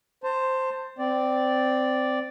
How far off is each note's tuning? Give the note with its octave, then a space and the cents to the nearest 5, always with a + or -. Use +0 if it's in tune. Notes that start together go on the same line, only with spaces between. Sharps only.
C5 +0 A5 +25
C4 -15 D5 +0